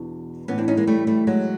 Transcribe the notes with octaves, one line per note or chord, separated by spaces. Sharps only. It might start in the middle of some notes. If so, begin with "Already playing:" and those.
Already playing: E2 B2 D4
A2 E3 B3 C#4
C4 D4
C#4 D#4
G#3 A#3
G3 A3
G3 A3
F#3 G#3